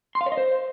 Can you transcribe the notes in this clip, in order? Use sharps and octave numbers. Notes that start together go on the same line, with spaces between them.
C6
F5
C#5
D#5
C5